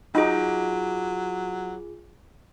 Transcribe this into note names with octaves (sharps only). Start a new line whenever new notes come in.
F#3 D#4 F4 G#4